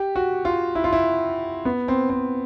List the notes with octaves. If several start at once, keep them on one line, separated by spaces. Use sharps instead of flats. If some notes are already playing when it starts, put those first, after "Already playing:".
Already playing: G4
F#4
F4
E4
F4
E4
B3
C4
C4